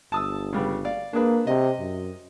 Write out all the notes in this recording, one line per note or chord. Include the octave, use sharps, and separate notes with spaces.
G1 A5 D#6 E6
C#3 G3 B3
D5 F5
A#3 D4 G#4 B4
C3 D#5
F#2